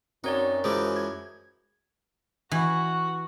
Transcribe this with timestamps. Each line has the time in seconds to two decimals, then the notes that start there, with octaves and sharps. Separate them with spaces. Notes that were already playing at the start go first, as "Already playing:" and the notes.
0.24 F#2 C4 D#4 C#5 D5
0.64 E3 F3 G#3 C5 D6
0.96 G#6
2.51 E3 F#4